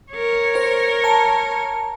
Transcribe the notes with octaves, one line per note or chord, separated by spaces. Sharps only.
A#4 C#5
C5
A5 A#5